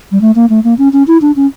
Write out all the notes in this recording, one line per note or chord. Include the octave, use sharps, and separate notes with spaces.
G3
A3
A#3
A3
A#3
C#4
C#4
E4
D4
C#4